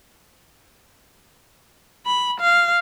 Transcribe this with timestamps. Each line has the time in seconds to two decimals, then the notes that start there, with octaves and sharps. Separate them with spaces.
2.06 B5
2.40 F5